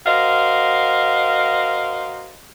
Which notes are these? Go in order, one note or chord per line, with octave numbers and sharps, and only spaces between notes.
F#4 A#4 C5 D#5 F5